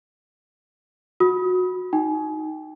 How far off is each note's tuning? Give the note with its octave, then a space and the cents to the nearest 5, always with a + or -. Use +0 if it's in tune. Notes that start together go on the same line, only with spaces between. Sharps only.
F#4 -20 D#6 +30
D#4 +0 G5 +0